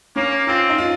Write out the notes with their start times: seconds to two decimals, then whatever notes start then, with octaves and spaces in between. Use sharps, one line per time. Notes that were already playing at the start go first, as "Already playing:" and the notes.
0.16 A#3 C#4
0.47 C4 F4
0.69 D#4
0.78 F4